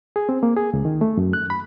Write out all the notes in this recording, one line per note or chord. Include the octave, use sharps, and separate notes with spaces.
G#4
C4
A#3
G#4
C#2
D#3
A3
F#2
F#6
B5